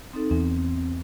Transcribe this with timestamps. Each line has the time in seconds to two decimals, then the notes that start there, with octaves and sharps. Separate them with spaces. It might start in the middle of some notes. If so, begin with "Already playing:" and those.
0.13 C4 D#4 A4
0.31 E2 C4